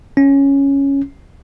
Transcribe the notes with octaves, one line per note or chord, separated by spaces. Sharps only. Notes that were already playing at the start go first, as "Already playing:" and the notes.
C#4